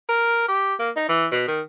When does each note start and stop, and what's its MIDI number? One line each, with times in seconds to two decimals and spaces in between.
0.09 0.45 70
0.48 0.74 67
0.79 0.89 58
0.96 1.07 63
1.09 1.26 52
1.32 1.47 47
1.47 1.60 51